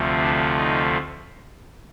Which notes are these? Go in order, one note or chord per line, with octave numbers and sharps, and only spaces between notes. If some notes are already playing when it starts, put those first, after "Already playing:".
Already playing: D2 C3 F3 A3
D4
D#4